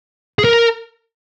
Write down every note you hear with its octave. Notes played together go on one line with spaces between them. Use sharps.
G#4
A#4